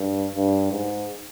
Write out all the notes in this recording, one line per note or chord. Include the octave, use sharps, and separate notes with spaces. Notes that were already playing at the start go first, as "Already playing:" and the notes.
Already playing: G2
G2
G#2